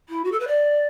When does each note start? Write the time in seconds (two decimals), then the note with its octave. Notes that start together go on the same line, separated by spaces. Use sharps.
0.09 E4
0.24 F#4
0.32 A4
0.40 B4
0.47 D5